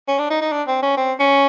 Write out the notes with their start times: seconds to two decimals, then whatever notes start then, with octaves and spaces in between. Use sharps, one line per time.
0.08 C#4
0.19 D4
0.30 D#4
0.41 D#4
0.52 D4
0.67 C4
0.82 C#4
0.97 C4
1.20 C#4